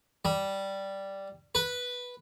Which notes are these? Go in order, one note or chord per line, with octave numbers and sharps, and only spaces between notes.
G3
B4